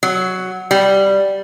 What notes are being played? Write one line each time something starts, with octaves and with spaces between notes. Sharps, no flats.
F#3
G3